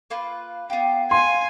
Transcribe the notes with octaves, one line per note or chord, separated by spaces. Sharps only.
A#3 F4 B4
B3 G4 F5
F5 G#5 C6